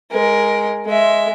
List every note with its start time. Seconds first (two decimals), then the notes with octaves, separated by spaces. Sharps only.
0.11 G#3 A#4
0.85 G#3 E5